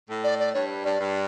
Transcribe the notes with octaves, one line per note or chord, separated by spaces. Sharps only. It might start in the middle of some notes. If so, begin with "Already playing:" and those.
A2
D5
D5
G2 C#5
G2 D5
G2